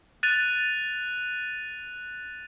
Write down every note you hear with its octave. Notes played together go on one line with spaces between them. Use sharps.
F#6 A6 D#7 F7